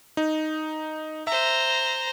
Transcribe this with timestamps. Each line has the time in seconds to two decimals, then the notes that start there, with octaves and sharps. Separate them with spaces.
0.17 D#4
1.27 C5 E5 A#5